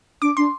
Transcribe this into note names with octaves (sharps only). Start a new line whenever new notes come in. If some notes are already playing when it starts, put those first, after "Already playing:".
D4 D6
D4 C6